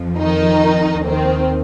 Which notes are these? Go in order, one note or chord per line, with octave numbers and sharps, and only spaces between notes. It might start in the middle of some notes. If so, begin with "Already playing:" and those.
Already playing: F2 F3
D#3 D#4
D#2 D#3 C4